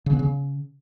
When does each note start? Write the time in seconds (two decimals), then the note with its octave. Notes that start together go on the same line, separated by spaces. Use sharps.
0.06 C#3
0.13 B3
0.19 C#3